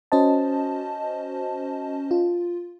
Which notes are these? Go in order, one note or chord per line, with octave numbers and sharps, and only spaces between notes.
C#4 F#4 C5 D#5 A5
F4